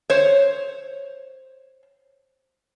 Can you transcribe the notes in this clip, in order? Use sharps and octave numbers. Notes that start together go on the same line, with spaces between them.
C5 C#5